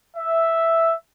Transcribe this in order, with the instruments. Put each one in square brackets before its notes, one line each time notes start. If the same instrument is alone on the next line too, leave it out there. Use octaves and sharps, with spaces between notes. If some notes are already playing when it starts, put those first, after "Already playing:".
[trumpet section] E5